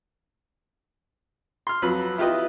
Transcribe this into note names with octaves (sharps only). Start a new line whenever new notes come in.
C6 F6
F2 F#3 B4 B5
E4 F4 G4 B4 D#5